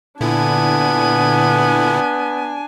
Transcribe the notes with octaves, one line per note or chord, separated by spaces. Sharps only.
A#2 D3 B3 D4 E4 G#5